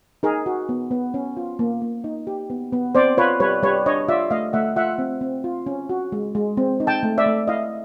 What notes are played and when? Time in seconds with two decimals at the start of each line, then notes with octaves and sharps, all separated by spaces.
0.23 D#4 G#4 A#4
0.46 F#4
0.69 B3
0.91 B3
1.14 C#4
1.37 F4
1.59 A#3
1.82 A#3
2.04 D#4
2.27 G4
2.50 B3
2.73 B3
2.95 C4 C5 D5
3.17 F4 B4 C#5
3.40 G3 B4 C#5
3.63 G3 B4 C#5
3.86 D4 C#5 D#5
4.08 F4 D5 E5
4.31 A3 D#5 F5
4.53 A3 E5 F#5
4.76 F4 E5 F#5
4.98 C4
5.21 C4
5.44 F4
5.66 C#4
5.89 F#4
6.12 G#3
6.35 G#3
6.57 C4
6.80 D#4
6.87 G5 A5
7.03 A3
7.18 D5 E5
7.26 A3
7.48 E4 D#5 F5